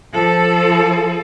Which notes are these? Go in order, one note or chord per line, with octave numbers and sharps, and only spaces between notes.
F3 A4